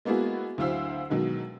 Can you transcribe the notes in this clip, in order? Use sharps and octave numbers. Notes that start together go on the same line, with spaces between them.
G#3 A#3 B3 E4 F#4 G#4
D2 F#3 E4 C5 F5 E6
B2 D#3 F#3 G#3